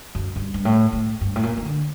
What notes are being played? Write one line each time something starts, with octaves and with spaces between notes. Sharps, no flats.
F#2
G2
G2
A2
A2
G2
A2
A#2
D#3
D3